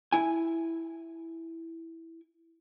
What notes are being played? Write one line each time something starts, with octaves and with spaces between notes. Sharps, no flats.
E4 G#5